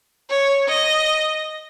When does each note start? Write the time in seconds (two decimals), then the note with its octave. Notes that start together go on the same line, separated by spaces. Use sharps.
0.30 C#5
0.68 D#5